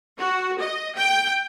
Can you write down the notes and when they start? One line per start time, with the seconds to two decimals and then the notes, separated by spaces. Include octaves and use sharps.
0.19 F#4
0.60 D#5
0.96 G5